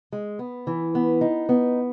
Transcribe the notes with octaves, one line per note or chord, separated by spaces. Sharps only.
G#3
B3
E3
B3
D#4
B3